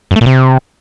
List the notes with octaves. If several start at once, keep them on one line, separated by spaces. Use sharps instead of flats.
F#2
A3
A#2
C3